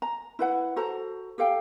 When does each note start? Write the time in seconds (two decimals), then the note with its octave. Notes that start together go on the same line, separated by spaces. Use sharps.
0.02 A#5
0.39 E4 B4 F#5
0.76 F#4 A4 C5 A#5
1.38 G4 A4 F5 G5